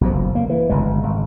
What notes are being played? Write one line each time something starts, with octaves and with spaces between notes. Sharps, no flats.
B1 B2 F3
F#1
A#3
E3
G1 C#3 G#3
G#1